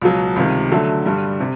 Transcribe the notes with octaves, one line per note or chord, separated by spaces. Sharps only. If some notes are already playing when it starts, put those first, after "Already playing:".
C#2 B2 F#3
C#2 C3 D#3 G3
D3 F#3 A3
G2 D3 G3
C3